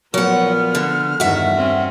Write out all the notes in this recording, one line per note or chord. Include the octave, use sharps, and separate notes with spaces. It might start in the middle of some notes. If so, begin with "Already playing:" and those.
A#2 F3 F#3 B3 F#5 F6
D3
E2 G2 D#3 F#4 E5 F#5
C4 C#4